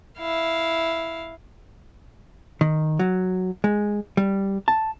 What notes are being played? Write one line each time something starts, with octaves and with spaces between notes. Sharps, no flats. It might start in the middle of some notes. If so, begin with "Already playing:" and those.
E4 F5
D#3
F#3
G#3
G3
A5